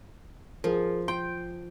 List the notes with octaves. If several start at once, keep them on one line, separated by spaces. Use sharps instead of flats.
F3 G#4 A#4
G5 C6